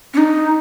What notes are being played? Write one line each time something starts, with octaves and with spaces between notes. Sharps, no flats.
C#4
D#4